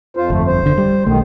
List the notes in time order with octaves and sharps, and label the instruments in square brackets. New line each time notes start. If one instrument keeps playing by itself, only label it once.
[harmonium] F2 F4 C5
[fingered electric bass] G1 F2 [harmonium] A3
[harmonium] C5
[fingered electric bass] G1 D3
G3
[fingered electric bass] B1 A3 [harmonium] D#3